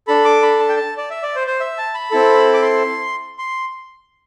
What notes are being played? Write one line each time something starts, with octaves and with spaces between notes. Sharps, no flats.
D4 A4 B5
D6
B5
A5
G5
A5
D5
E5
D5
C5
C5
E5
A5
B5
C4 E4 A4
D6
C6
C6